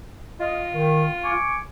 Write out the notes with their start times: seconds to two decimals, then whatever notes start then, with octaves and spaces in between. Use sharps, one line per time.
0.40 F4 D#5
0.73 D#3
1.23 G#5 C#6 D6